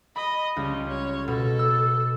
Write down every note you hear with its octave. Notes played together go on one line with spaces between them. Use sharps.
D#5 B5
C#2 G3 C#4
C#5
B2 A4
E6